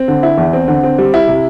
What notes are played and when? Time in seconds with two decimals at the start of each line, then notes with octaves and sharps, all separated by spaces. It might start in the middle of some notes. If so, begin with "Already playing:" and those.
Already playing: C4
0.08 D3
0.23 E4
0.38 E2
0.53 C4
0.68 D3
0.83 C4
0.99 G3
1.14 E4
1.28 C3